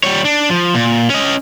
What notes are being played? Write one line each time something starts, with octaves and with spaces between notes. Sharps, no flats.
G3 C#5
D4
F3
A#2
C#4 D#5